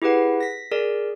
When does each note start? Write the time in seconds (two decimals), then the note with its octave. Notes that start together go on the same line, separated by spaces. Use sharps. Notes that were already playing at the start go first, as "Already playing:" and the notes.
0.02 E4 G4 G#4 B4 F#5
0.41 A#6 B6
0.71 G#4 A#4 D5